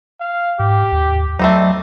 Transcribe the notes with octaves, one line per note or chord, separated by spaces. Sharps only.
F5
G#2 G4
D#2
F#3 A3 C4 D#4 D5